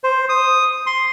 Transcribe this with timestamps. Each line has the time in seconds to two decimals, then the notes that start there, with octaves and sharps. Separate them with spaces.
0.04 C5
0.29 D#6
0.86 C6